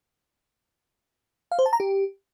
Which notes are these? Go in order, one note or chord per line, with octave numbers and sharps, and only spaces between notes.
F5
C5
A5
A#5
G4